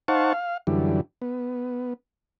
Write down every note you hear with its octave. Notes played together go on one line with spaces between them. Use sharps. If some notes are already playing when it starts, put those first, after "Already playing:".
D#4 C5 F5 F#5 A5 C#6
F5
F#2 D3 E3 G3
B3